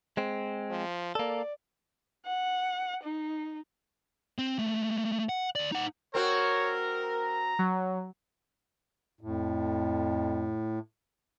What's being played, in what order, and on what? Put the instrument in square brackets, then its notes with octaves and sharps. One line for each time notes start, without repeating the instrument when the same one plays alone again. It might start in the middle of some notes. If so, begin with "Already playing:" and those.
[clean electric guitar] G#3 C4
[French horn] F3
[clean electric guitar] A#3 A4 [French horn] D5
[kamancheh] F#5
D#4
[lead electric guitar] C4
A3 A#3
F#5
D2 D5
D#4 F#5
[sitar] C4 F#4 [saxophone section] A#4 [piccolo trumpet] C#5
[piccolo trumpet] A#5
[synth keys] F#3
[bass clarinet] F2 [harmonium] A2